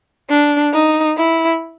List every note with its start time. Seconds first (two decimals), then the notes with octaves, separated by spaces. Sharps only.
0.29 D4
0.73 D#4
1.17 E4